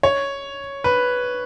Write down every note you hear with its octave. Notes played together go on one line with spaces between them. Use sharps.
C#5
B4